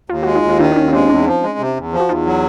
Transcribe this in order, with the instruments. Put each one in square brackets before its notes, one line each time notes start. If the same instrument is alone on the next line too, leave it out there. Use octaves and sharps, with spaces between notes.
[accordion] D#2 [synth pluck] F4
[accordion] G#3 [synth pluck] F#4
[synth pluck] D#4 F4
[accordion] D#2
[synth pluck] F4
[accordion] D#3 [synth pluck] D4 E4
[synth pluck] D4
[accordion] D#2 [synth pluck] C#4 D#4
[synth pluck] D#4
[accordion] G#3 [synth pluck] C4 D4
[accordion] E2 [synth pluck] C#4 D#4
[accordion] F3
G#3
C3
E2
F3
[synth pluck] F#4
[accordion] E2 [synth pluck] D#4 F4
[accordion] F#3